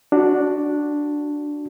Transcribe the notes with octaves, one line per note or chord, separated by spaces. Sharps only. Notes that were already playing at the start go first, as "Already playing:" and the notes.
D4 F#4